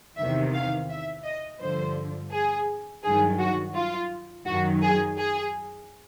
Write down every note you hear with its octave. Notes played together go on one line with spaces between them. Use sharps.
E2 C3 D#3 E5
F5
E5
D#5
G2 D3 F3 C5
G#4
G2 D#3 F#3 G#4
F#4
F4
F#2 D#3 F#3 F#4
G#4
G#4